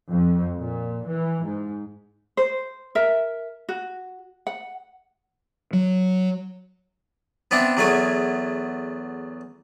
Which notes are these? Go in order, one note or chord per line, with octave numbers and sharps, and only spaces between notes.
F2
A#2
E3
G#2
C5
A#4 E5
F#4
F#5
F#3
B3 C4 D4 E5
E2 F#3 A3 G#4 G#5